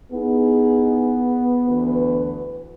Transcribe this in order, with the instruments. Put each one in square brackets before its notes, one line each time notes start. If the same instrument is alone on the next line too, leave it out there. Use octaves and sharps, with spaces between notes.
[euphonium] B3 [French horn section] D#4 E4 G#4
[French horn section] D2 E3 B4